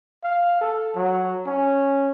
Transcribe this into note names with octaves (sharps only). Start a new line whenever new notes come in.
F5
A4
F#3
C#4